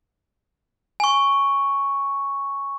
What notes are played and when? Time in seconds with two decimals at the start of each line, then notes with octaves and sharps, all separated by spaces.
1.00 G#5 C#6